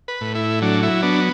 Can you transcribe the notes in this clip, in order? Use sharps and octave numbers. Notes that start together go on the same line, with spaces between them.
B4
A2
E4
F#3 D4
E4
B3 D4